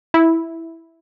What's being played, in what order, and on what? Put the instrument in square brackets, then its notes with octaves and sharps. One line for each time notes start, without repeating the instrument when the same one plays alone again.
[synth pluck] E4